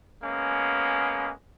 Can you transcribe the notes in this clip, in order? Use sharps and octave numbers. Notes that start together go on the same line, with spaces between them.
G#3 A#3 B3 C#4